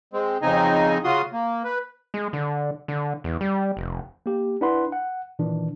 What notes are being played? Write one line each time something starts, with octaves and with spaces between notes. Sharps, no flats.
G#3 C4
F2 C#3 C4 D#4 D#5 G#5
C#3 F4 F#4 C6 D#6
A#3
B4
G#3
D3
D3
E2
G3
F1
A#3 G4
D4 E4 B4 F#5 B5 C6
F#5
A#2 D#3 E3 D4